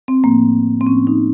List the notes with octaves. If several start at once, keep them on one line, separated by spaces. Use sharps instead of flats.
C4
A2 F3 A3 A#3
C4
A2 F3 A3 C#4
D#4